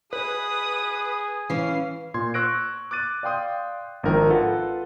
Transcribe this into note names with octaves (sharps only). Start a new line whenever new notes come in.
G#4 B4 D#6
E3 C#4 F5 C7
A#2 C6 G#6
C#6 E6 F#6 A#6 D7
D6 F#6 A6 D#7
D5 F5 G5 C6 D#6 G6
G#1 D#3 F3 D4 A#4 G5
F4 A4 B4 F#5